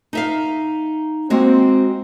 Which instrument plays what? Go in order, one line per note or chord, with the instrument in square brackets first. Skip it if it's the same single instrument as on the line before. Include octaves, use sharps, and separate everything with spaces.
[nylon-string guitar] D#4 E5 F5
[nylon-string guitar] G#3 A#3 F#4 [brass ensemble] C4